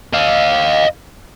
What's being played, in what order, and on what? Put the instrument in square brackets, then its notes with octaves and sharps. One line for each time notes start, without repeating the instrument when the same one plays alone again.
[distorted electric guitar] D#5 F5